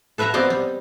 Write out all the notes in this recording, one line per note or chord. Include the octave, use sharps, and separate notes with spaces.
A4 B4 E5 F#5 A#5
B3 C4 D5 D#5
G3